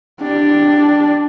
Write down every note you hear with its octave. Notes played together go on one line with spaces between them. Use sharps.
D4 G4